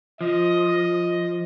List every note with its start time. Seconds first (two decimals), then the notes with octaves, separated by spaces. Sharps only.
0.21 F3 D#5